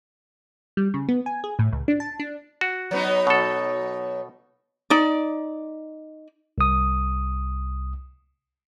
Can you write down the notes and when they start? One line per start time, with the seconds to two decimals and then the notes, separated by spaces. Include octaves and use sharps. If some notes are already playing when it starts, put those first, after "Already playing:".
0.77 G3
0.94 C#3
1.09 B3
1.26 G#5
1.44 G#4
1.59 A2
1.72 C#2
1.88 D4
2.00 A5
2.20 D4
2.61 F#4
2.91 F#3 B3 D#4
3.27 B2 A4
4.90 D#4 D5
6.58 C2 D#6